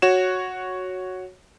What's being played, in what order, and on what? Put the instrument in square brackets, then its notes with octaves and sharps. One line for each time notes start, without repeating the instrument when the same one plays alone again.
[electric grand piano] F#4 C#5 E7